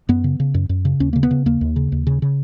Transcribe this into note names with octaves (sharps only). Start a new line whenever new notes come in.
F#2 B3
C#3
C#3
F#2
F#2
C#3
D#2 C#4
C#3 A#3
B3
C#3
D#2 A#3
D#2
C#3
D#2
C#3
C#3